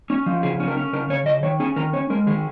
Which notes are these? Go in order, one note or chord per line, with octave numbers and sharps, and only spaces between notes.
C#4
F3
C#3 G#4
C#4
A#4
C#4
C#3 A#4
C#3 C#5
C#3 D#5
D#3 C#5
C#4 G#4
D#3 A#4
C#4 C#5
G#3 A#4
D#3 G#4